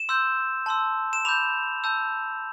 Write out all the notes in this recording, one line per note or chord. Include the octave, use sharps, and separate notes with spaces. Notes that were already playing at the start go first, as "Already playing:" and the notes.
Already playing: E7
C6 E6 G6
A5 C6 E6
E7
B5 D6 G6 F7
A5 E6 G6